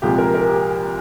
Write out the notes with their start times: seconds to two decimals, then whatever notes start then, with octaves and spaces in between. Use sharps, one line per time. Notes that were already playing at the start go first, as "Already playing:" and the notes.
0.02 C2 A#2 F3 G#3 G4
0.18 A#4
0.34 A#4
0.49 G4